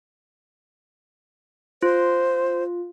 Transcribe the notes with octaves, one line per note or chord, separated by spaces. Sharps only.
F4 C5